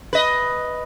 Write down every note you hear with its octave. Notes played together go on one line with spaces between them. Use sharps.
B4 D#5